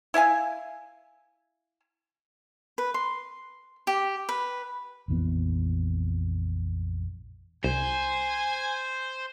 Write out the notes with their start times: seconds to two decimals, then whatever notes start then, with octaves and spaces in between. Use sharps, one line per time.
0.14 E4 E5 F5 G#5
2.78 B4
2.94 C6
3.87 G4
4.29 B4
5.08 A#1 F2 E3 B3
7.64 C2 C5 G#5